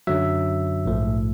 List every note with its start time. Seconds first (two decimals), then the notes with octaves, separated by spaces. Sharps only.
0.07 F#2 D3 F#3 E5
0.86 A#1 G#2 F3 A3